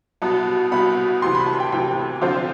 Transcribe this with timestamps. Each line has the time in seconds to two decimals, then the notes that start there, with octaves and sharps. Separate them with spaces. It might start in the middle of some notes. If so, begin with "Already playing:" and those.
0.22 C2 B2 B3 A5
0.72 C2 B2 B3 B5
1.22 D2 C3 E3 C6
1.35 B5
1.46 A5
1.60 G5
1.72 D2 C3 E3 G5
2.22 D3 F3 C4 F4 C5